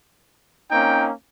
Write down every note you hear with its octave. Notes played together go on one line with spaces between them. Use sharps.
A#3 C4 C#4 D#4 G5